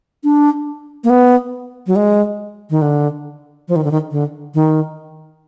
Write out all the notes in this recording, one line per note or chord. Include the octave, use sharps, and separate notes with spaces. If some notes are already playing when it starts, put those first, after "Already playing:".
D4
A#3
B3
F#3
G#3
D#3
D3
F3
D#3
D3
D#3
D3
D#3